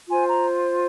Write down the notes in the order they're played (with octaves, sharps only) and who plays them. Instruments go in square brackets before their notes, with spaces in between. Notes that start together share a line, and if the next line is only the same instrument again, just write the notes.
[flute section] F4 C5 G#5
A#5